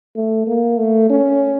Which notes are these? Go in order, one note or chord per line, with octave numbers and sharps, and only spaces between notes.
A3
A#3
A3
C#4